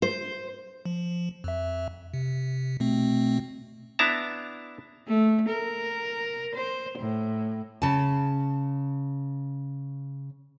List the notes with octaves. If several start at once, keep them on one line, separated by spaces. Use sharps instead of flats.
C5
F3
F2 E5
C3
B2 A3 C4
B3 D4 E4 E5 A5 A#5
A3
A#4
C5
A2
C#3 A5